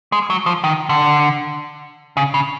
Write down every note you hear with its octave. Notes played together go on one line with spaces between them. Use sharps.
G#3
F#3
F3
D#3
D3
C#3
C#3